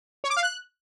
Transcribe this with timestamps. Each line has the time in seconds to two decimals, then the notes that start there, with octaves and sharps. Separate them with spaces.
0.24 C#5
0.30 D6
0.36 F5
0.43 F#6